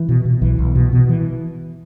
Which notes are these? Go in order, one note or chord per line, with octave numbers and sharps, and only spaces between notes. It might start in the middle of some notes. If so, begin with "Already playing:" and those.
Already playing: E3
B2
B2
B1 E3
B1
B2
B2
E3